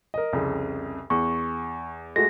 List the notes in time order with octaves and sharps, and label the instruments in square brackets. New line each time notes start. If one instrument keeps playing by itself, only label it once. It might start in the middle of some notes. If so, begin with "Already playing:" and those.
[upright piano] A#4 D#5
C2 F2 C#3
[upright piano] E2 [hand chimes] C#6
[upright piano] G#3 A3 F#4 [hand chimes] A#6